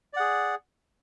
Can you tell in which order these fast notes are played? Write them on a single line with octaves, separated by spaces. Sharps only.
D5 F#5 G#4